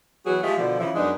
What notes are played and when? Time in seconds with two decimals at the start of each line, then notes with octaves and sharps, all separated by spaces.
0.25 E3 F#3 B3 F#4 G#4
0.42 F3 G#3 A3 F4 G4
0.56 B2 D3 F3
0.79 C#3 E3 F3
0.95 F#2 G#3 B3 D4 D#4